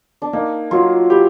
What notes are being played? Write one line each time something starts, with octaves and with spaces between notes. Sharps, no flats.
D4
A#3 D#4
F#3 F4
E4 G4